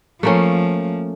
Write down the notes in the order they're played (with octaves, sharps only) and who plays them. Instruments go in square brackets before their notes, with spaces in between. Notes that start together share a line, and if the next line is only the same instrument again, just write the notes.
[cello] F3 [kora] A3 A#3 C#4